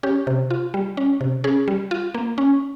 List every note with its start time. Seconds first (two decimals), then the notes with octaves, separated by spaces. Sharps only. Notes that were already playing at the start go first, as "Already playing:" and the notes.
0.03 C#4 G4
0.27 C3
0.50 F4
0.74 G3
0.97 C#4
1.21 C3
1.44 C#4 G#4
1.68 G3
1.91 F4
2.14 A#3
2.38 C#4